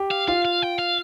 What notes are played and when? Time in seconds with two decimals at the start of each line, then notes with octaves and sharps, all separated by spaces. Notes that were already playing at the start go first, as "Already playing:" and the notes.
Already playing: G4
0.11 F5
0.28 F4 F5
0.45 F5
0.62 G5
0.79 F5